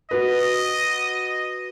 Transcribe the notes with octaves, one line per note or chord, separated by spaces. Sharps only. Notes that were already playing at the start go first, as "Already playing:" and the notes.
F#4 B4 D#5